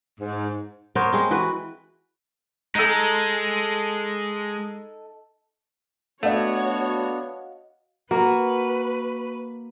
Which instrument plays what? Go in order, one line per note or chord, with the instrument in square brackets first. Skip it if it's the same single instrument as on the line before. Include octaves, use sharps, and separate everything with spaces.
[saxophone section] G#2
[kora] B3 A#4 C5 C#5
G#3 C4
E3 F#4 B4
[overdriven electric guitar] G#3 [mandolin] D#4 A4
[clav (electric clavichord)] A3 [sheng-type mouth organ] B3 D4 [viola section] F#4 C#5 [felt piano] D#5 F5 F#5
[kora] A#3 [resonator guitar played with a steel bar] F#4 [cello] B4